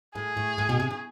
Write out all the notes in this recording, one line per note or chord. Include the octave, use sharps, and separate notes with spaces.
A2 G#4
A2
A2
B2
C3
C#3